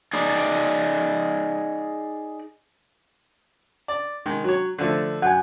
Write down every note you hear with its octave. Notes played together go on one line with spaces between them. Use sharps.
D#4 G#4 D5
D5
D#3 G#3
F#3 C#5
D3 F3 A3
F#2 F#5 G#5